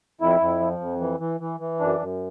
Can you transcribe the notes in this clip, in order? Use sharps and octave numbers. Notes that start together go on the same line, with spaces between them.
F2 E4
F2
F3
F2
E3
E3
E3
E3
F#2 D4
F#2